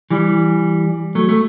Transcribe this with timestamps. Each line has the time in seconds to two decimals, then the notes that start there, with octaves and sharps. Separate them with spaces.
0.11 E3 G3
1.15 F#3 A3
1.29 A3